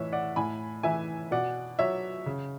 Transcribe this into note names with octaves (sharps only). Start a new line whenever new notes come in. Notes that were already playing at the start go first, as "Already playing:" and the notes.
Already playing: A2 E3 C#5 E5
D5 F#5
A2 G#5 B5
E3 E5 G#5
B2 D5 F#5
F#3 C#5 E5
C#3